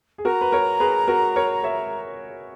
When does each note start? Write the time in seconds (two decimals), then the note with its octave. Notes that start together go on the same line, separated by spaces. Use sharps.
0.18 G#4
0.25 F#4 A#4 A#5
0.41 B4
0.52 A#4 C#5
0.80 G#4 B4
1.08 F#4 A#4
1.36 A#4 C#5
1.63 C#5 E5